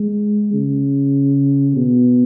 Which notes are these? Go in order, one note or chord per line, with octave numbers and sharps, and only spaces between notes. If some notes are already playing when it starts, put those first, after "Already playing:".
Already playing: G#3
C#3
B2